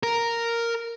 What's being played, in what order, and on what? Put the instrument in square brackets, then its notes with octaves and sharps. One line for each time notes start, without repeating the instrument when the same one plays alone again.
[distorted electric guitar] A#4